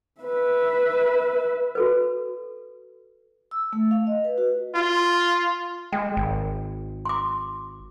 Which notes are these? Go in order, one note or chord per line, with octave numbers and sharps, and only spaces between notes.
B4 E5
F#4 A4 B4
E6
A3
F5
D#5
B4
F#4
F4
G#3 G5
G#1
C6 D6